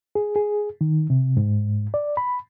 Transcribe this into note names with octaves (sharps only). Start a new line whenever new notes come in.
G#4
G#4
D#3
C3
G#2
D5
B5